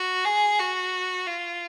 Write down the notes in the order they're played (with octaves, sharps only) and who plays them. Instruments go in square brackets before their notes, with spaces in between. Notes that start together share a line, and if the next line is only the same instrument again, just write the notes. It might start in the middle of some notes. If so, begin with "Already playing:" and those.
Already playing: [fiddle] F#4
G#4
F#4
F4